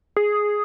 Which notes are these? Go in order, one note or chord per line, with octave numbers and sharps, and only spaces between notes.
G#4